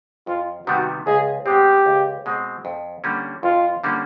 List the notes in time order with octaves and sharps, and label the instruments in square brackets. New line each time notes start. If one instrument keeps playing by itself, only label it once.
[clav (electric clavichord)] F2 [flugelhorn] F4
[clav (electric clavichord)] C3 D#3 G3 B3 [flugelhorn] F#4
[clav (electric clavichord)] C#2 [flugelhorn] G#4
[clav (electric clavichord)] B2 G#3 C4 [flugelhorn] G4
[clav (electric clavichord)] C#2
B2 G#3 C4
F2
D3 G3 A#3 C#4
[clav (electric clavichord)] F2 [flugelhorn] F4
[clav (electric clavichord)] D3 G3 A#3 C#4